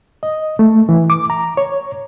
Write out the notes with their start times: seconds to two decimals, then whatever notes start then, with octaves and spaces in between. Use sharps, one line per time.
0.23 D#5
0.59 A3
0.89 E3
1.10 D6
1.30 A#5
1.57 C#5